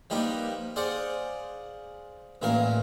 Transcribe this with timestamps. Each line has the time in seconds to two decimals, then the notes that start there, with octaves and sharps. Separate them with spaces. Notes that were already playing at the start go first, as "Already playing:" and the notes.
0.10 F3 G3 A#3 D#4 G4 B4
0.76 G#4 C5 D5 F5 F#5
2.42 A1 A#2 E3 A#4 F5